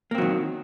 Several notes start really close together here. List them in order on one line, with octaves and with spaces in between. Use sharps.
A#3 C4 F#3 D#3